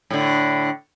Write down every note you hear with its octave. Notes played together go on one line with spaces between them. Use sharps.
A2 D3